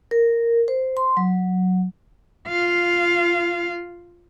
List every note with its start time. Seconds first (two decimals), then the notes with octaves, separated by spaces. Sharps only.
0.11 A#4
0.68 C5
0.97 C6
1.17 F#3
2.48 F4 F5